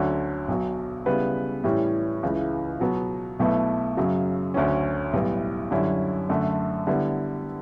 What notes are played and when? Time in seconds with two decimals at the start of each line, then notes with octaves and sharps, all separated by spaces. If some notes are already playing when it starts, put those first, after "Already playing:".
Already playing: D2 D3 F#3 C#4
0.48 B1 B2 F#3
1.06 C#3 G3 B3 E4 B4
1.64 A2 E3 G3 C#4 G4
2.23 C#2 C#3 E3
2.80 B2 F#3 B3
3.39 B1 B2 A3 E4 B4
3.97 F#2 C#3 F#3
4.54 D2 D3 F#3 C#4
5.13 B1 A2 G3 B3
5.71 F#2 D3 G3 C#4 E4
6.29 F#2 D3 A3
6.87 D3 G3 B3 E4